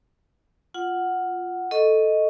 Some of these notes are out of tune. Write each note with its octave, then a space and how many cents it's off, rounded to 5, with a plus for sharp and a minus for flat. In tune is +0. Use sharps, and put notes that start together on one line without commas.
F4 +0 F#5 +0
A4 +0 D#5 +0 C#6 +0